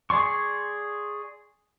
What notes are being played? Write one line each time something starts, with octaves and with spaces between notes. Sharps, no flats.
G#4 D5 C6 C#6